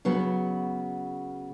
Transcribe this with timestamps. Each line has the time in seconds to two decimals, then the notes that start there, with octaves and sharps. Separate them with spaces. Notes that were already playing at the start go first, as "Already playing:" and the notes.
0.05 C#3 F#3 B3